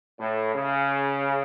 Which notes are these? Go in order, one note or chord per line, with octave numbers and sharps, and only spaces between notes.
A2
C#3